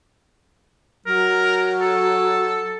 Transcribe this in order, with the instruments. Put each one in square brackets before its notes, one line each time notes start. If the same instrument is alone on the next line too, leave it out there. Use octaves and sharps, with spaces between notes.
[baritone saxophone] F#3 [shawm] A#4
[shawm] A4